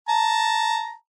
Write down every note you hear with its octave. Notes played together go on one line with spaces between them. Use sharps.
A5 A#5